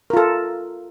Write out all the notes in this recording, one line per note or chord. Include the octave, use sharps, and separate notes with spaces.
F4 A4 A#4